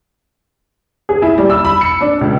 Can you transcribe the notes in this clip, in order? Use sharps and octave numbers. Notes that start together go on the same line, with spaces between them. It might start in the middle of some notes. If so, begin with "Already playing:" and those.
G#4
E4
G3
E6
B5
C#7
D4
C#2